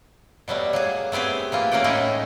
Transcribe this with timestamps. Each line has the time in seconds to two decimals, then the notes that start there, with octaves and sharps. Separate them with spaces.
0.48 B2 F#3 G3 A3
0.73 F#3 A#3 G#4
1.12 A3 B3 C4 G4 G#4
1.52 E3 A#3 F4
1.71 A3 A#3 C#4 F#5 G5
1.84 A2 G#3 A3 C#4 D#4 E4